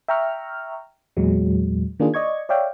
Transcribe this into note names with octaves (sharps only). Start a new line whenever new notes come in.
E5 G5 A#5 C#6 F6
E2 A#2 F#3 G#3
D#3 A#3 D4 F4 G#4
D5 D#5 C#6 G#6
C#5 D5 E5 F5 G5